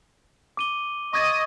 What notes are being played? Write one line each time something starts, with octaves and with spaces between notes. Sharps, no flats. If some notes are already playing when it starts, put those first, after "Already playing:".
D6 D#7 G7
D#5 C#6 D#6 G#6 A6